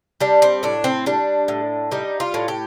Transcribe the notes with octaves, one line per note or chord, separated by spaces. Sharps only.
G3 D4
C4
A2 D4
C4
G3 D4
A2
G3 D#4
F4
A2
G4